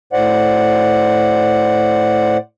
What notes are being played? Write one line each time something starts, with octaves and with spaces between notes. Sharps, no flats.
A2 C5 D5 F#5